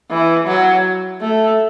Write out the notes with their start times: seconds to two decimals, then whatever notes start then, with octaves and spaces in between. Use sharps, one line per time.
0.11 E3
0.47 F#3
1.21 A3